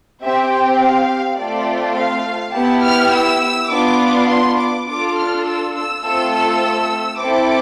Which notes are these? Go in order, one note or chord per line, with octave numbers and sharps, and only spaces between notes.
C4 G4 E5
G5
F5
A3 C4 F4 A4 D5
F5
B3 E4 G4 A5
F6
E6
B3 D4 F4 D6
C6
D6
D4 F4 A4 D6
F6
E6
E6
A3 C4 F4 A4 E6
E6
C4 E4 A4 D6